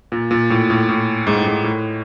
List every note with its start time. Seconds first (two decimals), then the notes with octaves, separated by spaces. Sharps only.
0.12 A#2
0.31 A#2
0.50 A2
0.70 A2
0.89 A2
1.27 G#2
1.37 A2
1.46 G#2
1.64 A2